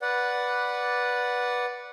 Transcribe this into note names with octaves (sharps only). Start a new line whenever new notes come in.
B4 D5 F#5